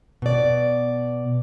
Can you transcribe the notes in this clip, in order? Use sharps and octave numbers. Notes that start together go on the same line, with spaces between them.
B2 D5